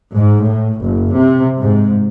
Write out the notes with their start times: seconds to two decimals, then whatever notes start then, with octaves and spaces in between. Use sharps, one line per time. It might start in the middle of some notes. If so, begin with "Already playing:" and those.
0.15 G#2
0.46 A2
0.82 F#1
1.16 C3
1.61 G#2